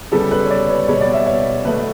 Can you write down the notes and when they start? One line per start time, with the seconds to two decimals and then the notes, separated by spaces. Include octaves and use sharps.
0.12 C#3 G3 B3 A4
0.31 B4
0.45 C#5
0.50 D5
0.69 C#5
0.88 B2 G3 B3 C#5
1.01 D5
1.14 E5
1.26 C#5
1.65 B2 A3 B4